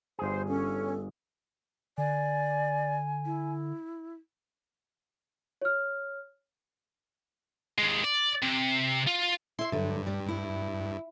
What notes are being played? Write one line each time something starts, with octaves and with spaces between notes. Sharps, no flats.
G1 G#4 C5
C#4 A4
D3 D5 G#5
E4
C#5 F6
D#2 G#3
D5
C3
F4
E4 E5 C6 C7
G2 D3 F#3
G3
E4